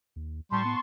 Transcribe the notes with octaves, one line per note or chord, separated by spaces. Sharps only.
D#2
A2 G3 A5 C6 C#6
B3